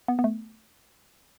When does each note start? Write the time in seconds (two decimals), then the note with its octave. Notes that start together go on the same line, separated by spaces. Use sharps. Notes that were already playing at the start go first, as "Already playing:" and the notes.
0.08 B3
0.19 B3
0.24 A3